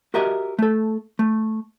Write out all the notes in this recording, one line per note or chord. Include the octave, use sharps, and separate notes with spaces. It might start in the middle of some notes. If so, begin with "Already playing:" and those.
F#4 G4 A#4 D#5 E5
A3 A4
A3